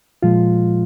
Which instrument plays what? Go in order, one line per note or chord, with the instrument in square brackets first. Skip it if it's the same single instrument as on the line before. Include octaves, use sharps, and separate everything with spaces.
[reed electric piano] A#2 F3 G#3 F4